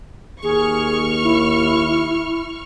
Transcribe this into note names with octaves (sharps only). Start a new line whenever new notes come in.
D#2 G#4 C#6 F6
E4